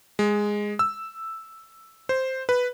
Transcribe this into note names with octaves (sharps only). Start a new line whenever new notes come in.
G#3
E6
C5
B4